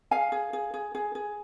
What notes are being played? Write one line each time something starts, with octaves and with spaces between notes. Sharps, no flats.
G#4 F5 G#5
G#4
G#4
G#4
G#4
G#4